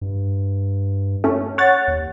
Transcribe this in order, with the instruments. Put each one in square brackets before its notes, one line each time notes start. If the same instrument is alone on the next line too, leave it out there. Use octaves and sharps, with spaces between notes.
[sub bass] G2
[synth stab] A3 C#4
C#5 F#5 A6
[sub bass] D#2